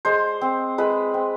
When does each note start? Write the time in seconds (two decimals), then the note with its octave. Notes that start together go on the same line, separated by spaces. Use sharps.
0.05 G#3 C5
0.41 C4
0.78 G#3 B4
1.14 C4